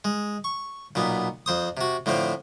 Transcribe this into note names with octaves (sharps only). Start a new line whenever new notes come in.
G#3
C#6
B1 A#2 B3
F2 C5 D#6
C3 F#4
A2 D3 F3 C4